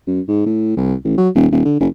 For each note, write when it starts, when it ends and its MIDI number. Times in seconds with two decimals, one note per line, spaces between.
0.07 0.21 42
0.28 0.44 44
0.46 0.77 45
0.77 0.94 36
1.04 1.15 33
1.18 1.29 54
1.35 1.47 27
1.52 1.63 27
1.65 1.78 50
1.80 1.87 30